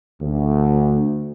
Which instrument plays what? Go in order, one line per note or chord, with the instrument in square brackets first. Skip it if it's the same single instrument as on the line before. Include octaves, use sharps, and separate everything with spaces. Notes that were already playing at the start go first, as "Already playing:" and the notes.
[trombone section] D2